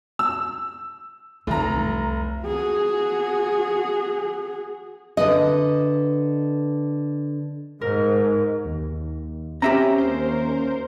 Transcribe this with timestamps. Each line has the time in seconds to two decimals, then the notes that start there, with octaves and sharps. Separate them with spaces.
0.19 E6
1.47 F1 E3 D#4 A#5
1.75 C2
2.44 F#4 G#4
5.17 D3 B4 D#5
7.81 G#2 A#4
8.65 D#2
9.62 C4 C#4 G4 E5 A#5
9.98 D#2 A#4 C5